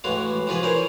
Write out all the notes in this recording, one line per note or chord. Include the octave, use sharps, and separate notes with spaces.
A2 E3 G#3 F#4 F5
E3 F3 F4 F#4 G#4 B4
E4 G#4 A#4 C5 C#5